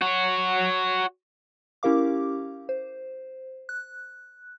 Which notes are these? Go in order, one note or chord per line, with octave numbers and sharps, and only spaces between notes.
F#4 C#5
C#4 E4 G4 A#4 F5 D6
C5
F#6